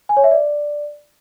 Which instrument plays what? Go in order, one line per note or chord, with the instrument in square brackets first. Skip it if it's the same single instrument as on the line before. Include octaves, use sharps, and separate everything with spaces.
[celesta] G#5
C#5
E5
D5